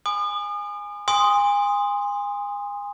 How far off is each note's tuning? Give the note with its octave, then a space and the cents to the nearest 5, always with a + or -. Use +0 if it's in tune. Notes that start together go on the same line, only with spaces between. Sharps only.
G#5 -10 C6 -45 D#6 -40
G#5 -30 C6 +0 D#6 +0